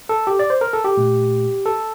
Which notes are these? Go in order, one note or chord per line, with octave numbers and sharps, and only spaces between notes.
A4
G4
D5
C5
A#4
A4
G4
A#2 A3
A4